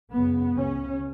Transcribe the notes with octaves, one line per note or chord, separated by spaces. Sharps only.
F#2 C#3 B3
C#2 C#3 C#4